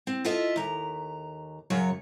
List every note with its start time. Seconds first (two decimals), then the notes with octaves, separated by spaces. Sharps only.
0.07 C4
0.25 F4 A4 D#5 E5
0.56 D#2 A#5
1.70 F#2 C#3 F#3 C#5